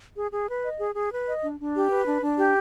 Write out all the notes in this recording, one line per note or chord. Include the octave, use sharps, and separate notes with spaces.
G#4
G#4
B4
D#5
G#4
G#4
B4
D#5
D4
D4
G4
B4
D4
D4
G4